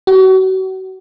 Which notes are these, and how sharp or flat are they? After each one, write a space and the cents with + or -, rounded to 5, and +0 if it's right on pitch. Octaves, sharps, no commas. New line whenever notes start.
F#4 +35